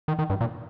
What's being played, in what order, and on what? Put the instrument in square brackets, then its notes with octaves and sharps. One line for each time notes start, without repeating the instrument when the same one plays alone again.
[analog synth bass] D#3
D#3
G2
A#2